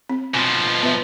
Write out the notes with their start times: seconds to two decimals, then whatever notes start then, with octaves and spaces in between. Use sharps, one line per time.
0.10 C4
0.34 B2 F3 G#5
0.82 B3 B4 E5